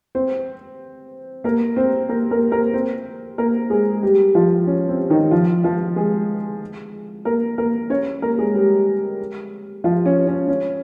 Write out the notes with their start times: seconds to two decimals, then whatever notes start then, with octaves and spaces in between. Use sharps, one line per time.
0.15 C4 C5
1.44 A#3 A#4
1.76 C4 C5
2.09 A#3 A#4
2.31 A#3 A#4
2.52 A#3 A#4
2.74 C4 C5
3.38 A#3 A#4
3.70 G#3 G#4
4.03 G3 G4
4.35 F3 F4
4.67 C#4
4.89 C4
5.10 D#3 D#4
5.31 F3 F4
5.64 F3 F4
5.96 G#3 G#4
7.25 A#3 A#4
7.58 A#3 A#4
7.90 C#4 C#5
8.22 A#3 A#4
8.38 G#3 G#4
8.54 G3 G4
9.84 F3 F4
10.06 C#4
10.27 C#4
10.48 C#4